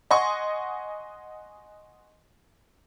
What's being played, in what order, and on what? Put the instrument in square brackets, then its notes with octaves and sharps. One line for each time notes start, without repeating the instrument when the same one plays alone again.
[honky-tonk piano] D#5 F#5 G#5 C6 C#6